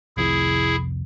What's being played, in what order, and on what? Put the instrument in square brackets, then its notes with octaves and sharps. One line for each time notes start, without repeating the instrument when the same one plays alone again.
[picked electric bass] F1 C2 F2 [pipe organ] E4 G#4